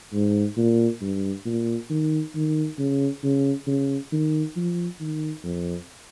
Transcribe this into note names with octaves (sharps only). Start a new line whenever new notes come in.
G#2
A#2
G2
A#2
D#3
D#3
C#3
C#3
C#3
D#3
F3
D#3
F2